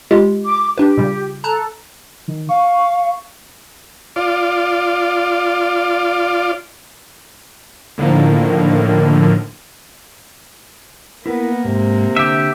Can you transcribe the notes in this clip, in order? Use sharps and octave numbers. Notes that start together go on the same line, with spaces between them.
G#3 F4 G4
D6
D4 G4 B4
A#2 C#3 G3
A4 A5 A#5 F#6
D#3
F5 C#6
F4 D5
A2 D3 D#3 F3 A#3
A#3 B3 E4 A#4 B4
G#2 C3
D3 G4 E5